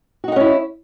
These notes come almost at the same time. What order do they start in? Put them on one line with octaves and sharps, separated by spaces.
F#4 D#4 F#5 C#4 E4